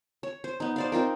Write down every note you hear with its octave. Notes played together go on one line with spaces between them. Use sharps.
C#5
C5
B3 D#4
C5 D5 F5
C4 D#4 F4 A#4